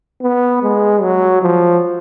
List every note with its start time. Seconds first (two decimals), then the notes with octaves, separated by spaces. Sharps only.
0.22 B3
0.63 G#3
1.02 F#3
1.42 F3